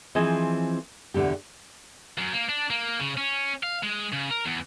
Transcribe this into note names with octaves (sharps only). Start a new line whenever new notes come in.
E3 F3 C4 G#4 D#5
E2 B2 D3 A3 G4
F#2
A#3
D4
A#3
C#3
C#4
F5
G#3
C#3
A#4
E2